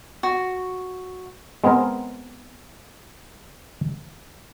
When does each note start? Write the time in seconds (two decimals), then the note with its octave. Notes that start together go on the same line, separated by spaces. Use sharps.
0.23 F#4
1.64 G#3 B3 C4 G#4 A#4